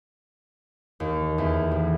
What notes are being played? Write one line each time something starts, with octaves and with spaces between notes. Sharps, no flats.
D#2
E2
A1